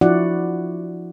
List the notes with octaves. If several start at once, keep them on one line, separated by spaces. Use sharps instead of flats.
F3 D4 E4 F#4 D5 F#5